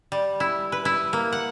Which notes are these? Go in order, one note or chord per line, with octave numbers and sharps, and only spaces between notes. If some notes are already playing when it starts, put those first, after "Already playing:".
G3
E4
B4
E4
A#3
F#5